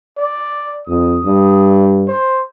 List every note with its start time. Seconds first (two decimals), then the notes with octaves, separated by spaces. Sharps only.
0.18 D5
0.87 F2 D#6
1.24 G2
2.08 C5